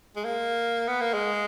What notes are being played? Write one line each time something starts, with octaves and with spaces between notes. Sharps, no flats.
G#3
A#3
B3
A#3
G#3